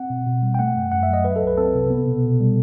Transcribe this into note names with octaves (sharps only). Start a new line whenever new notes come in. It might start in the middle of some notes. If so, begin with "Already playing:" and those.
Already playing: C4 F#5
B2
B2
G3
G5
A3 F#5
F#2
F#2 F#5
E5
F#3 D#5
F#3 B4
A4
C2
B4
C4 A4
C3
B3
B2
B2
G3